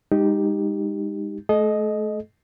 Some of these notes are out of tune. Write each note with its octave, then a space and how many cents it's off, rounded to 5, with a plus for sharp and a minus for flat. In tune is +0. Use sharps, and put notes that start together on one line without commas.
G#3 -35 D#4 +0 G4 +0
A3 -30 A4 -40 D#5 +0